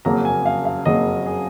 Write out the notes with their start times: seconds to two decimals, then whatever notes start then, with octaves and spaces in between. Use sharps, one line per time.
0.05 F#1 F2 C#3 F#3 A#3 A#5
0.25 G#5
0.46 F5
0.65 F5
0.85 F#1 F2 C#3 F#3 A#3 D#5
1.26 G#4